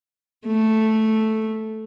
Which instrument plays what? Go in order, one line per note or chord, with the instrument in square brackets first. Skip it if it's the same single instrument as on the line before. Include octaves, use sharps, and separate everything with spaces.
[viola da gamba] A3